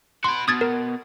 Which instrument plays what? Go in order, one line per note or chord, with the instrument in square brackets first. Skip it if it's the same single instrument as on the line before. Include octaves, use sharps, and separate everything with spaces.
[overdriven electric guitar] F#4 B5 [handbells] C6
[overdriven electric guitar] B2 [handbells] D#6 G#6 A6
[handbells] A#4